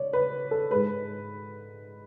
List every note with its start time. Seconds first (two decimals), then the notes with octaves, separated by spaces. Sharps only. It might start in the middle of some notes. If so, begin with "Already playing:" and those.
Already playing: C#3 C#5 D5
0.13 B4
0.51 A4
0.71 G#2 G#3 B4